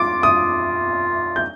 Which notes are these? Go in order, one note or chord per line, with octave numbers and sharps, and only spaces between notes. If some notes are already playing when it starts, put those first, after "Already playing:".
Already playing: F4 D6
D#6
G6